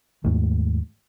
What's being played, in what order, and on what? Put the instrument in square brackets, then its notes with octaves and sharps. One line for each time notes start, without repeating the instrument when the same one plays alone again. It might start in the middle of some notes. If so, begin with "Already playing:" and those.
[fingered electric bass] D#2 G#2 A3 A#3